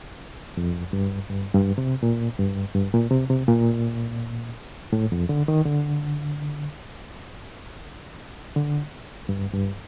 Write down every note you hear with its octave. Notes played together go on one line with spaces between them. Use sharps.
F2
G2
G2
G2
C3
A#2
G2
G2
A#2
C3
C3
A#2
A2
F2
D3
D#3
D3
D3
G2
G2